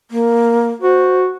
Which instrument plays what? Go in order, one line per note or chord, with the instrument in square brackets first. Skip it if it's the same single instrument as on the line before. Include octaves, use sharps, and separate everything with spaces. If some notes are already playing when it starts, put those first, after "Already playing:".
[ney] A#3
[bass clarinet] F#4 [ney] C5